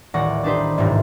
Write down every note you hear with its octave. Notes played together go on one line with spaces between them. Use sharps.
D#1 A1 D5 F#5 C#6 A#6
D4 D#4 G4 B4 C5
D#1 A1 G#2 C3 D#3